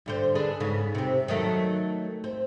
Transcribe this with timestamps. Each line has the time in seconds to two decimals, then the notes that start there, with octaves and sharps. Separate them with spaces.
0.06 G2 D3 C5
0.35 D4 G#4 B4
0.60 G#2 C#3 B3
0.95 C3 C4
1.28 D#3 F#3 A3
2.24 C4